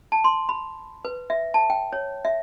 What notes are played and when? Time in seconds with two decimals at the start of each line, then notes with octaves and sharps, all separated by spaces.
0.12 A5
0.24 C6
0.49 B5
1.05 B4
1.30 E5
1.54 A5
1.70 G5
1.93 C#5
2.25 E5